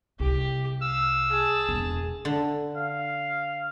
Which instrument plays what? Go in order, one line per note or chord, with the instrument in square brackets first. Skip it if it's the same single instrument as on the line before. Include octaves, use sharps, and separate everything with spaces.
[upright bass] C2 [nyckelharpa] G4
[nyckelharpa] F5 [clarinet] E6
[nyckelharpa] G#4 A5
[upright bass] E1
[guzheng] D3
[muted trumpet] F5